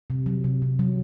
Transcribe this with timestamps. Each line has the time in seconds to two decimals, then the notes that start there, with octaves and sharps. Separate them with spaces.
0.10 C3
0.26 F#3
0.44 C3
0.62 C3
0.79 F#3